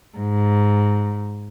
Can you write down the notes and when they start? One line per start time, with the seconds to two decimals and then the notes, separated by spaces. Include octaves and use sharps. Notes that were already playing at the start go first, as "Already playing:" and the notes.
0.18 G#2